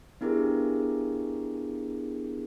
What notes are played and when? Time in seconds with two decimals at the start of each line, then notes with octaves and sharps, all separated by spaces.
0.21 B3 D4 E4 G4 G#4 A#4